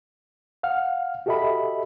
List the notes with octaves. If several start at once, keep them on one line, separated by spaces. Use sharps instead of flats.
F5 F#5 F6
F#4 G4 A4 D#5 E5 B5